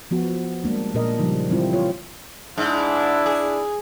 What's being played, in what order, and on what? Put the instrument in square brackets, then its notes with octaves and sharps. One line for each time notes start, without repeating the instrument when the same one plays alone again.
[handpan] F3 B3 F#4
G3 G#3 A#3 D4
A#2 D4 A#4 D#5
C#3 F3 G3 D#4
E3 G3 C4 E4 F4
F4 C#5
[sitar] G#2 [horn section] D4 E4
[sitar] G#4